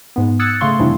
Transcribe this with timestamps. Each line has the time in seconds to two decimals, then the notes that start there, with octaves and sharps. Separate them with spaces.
0.16 G#2 B3
0.39 D#6 E6 F#6 G#6 A6 C#7
0.61 C#3 A3 F5 C6 C#6
0.79 F2 C3 E3 G3 D4 E4